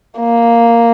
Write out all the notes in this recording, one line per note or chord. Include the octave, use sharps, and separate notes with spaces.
A#3